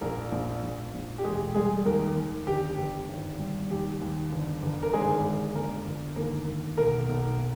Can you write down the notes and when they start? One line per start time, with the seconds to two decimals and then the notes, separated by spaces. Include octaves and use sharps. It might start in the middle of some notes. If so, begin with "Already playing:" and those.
0.01 A#1 A#3 A#4
0.32 A#1
0.63 A#1
0.94 A#1
1.18 G4
1.24 E1 G#3 G#4
1.54 G3 G#3 G#4
1.85 D#2 A#3 A#4
2.16 D#2
2.47 G1 G4
2.78 G1
3.09 G#1
3.39 G3
3.70 D#2 G4
4.02 D#2
4.32 G1
4.63 G1
4.83 A#4
4.93 G#1 G#3 G#4
5.25 G#3
5.55 G1 A#3 A#4
5.86 G1
6.16 D#2 A#3 A#4
6.47 D#2
6.77 B1 A#3 A#4
7.09 B1